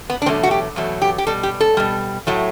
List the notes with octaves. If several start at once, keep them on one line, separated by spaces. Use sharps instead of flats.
B3
D4
E2 B2 F#3 A3 C4
F#4
G4
E2 B2 F#3 A3
G4
G4
B2 G3 A4
G4
A4
B2 G3
A2 F#3 A3